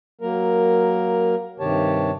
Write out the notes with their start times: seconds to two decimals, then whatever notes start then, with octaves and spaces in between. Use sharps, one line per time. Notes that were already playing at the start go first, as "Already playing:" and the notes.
0.21 F#3 A#3 A#4
1.60 G2 C3 D#3 G4 C#5 A5